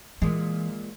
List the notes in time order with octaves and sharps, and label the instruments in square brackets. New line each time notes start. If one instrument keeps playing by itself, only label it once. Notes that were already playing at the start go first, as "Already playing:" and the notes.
[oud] A#2 G#3 [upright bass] E3